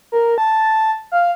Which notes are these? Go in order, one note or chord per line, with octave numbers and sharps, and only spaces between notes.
A#4
A5
F5